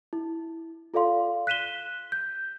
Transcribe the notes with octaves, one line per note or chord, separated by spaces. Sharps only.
E4
F4 A4 D5 F5 C6
F#6 B6 D#7 E7 G7
G6